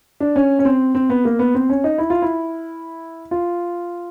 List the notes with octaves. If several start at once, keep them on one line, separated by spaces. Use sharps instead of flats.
D4
C#4
C#4
C4
C4
B3
A#3
B3
C4
C#4
D#4
E4
F4
E4
F4